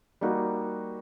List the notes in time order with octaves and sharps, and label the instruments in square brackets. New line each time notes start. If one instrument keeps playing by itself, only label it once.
[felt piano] G3 A#3 D#4 F#4